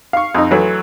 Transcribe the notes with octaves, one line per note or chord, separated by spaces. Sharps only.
F5 C#6
F2 D#4
E3 F#3 A3